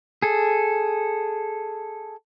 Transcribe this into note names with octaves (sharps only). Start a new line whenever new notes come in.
G#4 A4